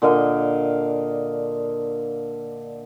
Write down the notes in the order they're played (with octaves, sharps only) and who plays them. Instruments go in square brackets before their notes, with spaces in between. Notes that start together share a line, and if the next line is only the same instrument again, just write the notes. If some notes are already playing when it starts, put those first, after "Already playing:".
[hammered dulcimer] A#2 D3 D#5 F5